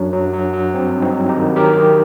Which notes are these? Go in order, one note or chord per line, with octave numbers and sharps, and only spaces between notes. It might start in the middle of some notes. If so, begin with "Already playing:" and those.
Already playing: F#2 F#3 D4
F#3
F#3
F#3
G2 C4
G2
C4 D#4
F#3
D#4 G4
D#3
F#3 G4 A#4
D#3